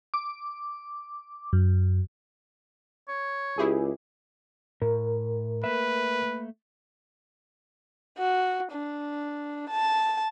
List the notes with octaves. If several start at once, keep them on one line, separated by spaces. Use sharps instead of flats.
D6
F#2
C#5
C#2 E4 G4 G#4
A2 A#4
A3 A#3 B4 E5
F#4
D4
A5